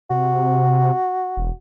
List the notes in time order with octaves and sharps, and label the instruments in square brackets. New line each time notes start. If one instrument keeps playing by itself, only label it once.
[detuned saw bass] C3 [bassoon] F#4
[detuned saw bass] E1